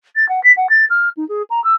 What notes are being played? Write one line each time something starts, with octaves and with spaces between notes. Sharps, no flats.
A6
F#5
B6
F#5
A6
F6
D#4
G#4
A#5
E6